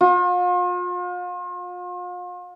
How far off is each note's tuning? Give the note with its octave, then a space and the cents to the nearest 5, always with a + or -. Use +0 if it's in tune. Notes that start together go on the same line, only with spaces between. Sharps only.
F4 +40